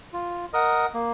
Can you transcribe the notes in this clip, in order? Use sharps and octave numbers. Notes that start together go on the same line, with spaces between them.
F4
A#4 D#5 F#5
A#3